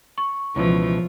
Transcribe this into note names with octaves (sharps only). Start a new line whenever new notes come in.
C#6
C#2 B2 E3 F3